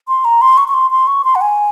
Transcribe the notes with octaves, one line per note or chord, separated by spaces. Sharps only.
C6
A#5
C6
C#6
C#6
C6
C6
C#6
C6
F#5
G#5